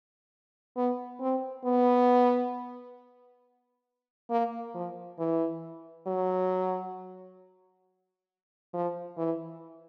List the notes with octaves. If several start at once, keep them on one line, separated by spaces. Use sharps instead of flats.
B3
C4
B3
A#3
F3
E3
F#3
F3
E3